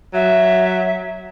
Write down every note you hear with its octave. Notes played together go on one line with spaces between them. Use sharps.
F#3 E5